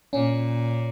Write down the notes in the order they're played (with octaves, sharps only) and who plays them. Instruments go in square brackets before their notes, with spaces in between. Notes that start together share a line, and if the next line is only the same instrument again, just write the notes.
[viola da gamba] A#2 [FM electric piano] C#4